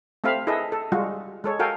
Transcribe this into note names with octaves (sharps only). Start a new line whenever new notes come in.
A3 C4 G4 E5 F5 B5
E4 G#4 A4 B4 D#5 E5
A4
G3 G#3 F4 F#4
G#3 A4 C#5
F#4 A4 A#4 F5 G5 G#5